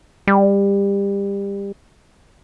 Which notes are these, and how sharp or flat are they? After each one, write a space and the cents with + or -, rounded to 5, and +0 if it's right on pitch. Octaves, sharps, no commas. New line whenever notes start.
G3 +25